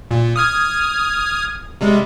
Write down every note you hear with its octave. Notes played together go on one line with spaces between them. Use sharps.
A#2
D#6 F6 G#6
C3 G3 G#3